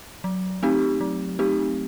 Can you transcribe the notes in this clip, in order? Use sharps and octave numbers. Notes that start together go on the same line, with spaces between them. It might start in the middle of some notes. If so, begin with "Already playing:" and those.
F#3
A3 C4 D#4 G4
F#3
A3 C4 D#4 G4